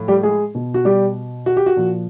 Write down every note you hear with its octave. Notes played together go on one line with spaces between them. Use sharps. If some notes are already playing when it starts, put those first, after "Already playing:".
Already playing: A2 F3
G3 G4
G#3 G#4
B2
F#4
G3 G4
F#4
G4
F#4
A#2 F3